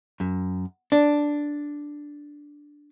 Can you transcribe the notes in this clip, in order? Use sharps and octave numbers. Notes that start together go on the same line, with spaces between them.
F#2
D4